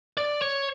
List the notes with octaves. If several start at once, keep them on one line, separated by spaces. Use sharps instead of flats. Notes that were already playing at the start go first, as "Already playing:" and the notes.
D5
C#5